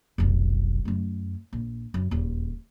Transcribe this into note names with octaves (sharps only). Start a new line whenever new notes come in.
F1 B1
F#2 A3
A#1
F#2
D#1 E2